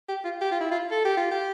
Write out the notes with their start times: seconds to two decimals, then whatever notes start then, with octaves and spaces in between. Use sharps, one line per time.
0.09 G4
0.25 F4
0.41 G4
0.52 F4
0.61 E4
0.71 F4
0.91 A4
1.05 G4
1.17 F4
1.31 G4